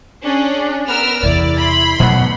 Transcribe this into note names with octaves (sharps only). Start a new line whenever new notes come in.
C#4 D4 G#4
B3 A#4 E6 F6
E2 C3 E4 D5
B5 C6
B2 F#3 A3 F#5